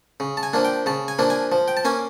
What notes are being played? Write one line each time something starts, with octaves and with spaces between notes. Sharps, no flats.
C#3
A5
G#5
F3 A#3 D4
G5
C#3 A5
G#5
F3 A#3 D4
G#5
F3
G5
A5
A#3 C#4 G#5